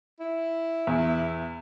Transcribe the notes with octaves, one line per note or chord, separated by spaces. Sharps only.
E4
E2